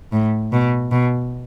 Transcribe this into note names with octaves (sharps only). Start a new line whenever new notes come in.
A2
B2
B2